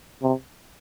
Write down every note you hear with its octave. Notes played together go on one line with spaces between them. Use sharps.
C3